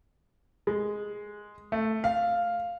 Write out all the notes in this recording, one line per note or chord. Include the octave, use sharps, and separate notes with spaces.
G#3
A3
F5